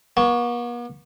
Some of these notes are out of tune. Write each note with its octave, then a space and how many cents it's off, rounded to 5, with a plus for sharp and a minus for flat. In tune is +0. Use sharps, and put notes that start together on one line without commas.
B3 -45 C#6 +10